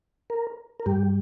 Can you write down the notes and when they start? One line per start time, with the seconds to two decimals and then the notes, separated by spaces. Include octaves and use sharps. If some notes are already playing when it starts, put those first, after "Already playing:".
0.30 A#4
0.80 A#4
0.86 G2 G3 G4